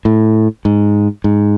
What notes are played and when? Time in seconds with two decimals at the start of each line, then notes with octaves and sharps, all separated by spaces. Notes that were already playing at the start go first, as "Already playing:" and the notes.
0.05 A2
0.65 G#2
1.24 G#2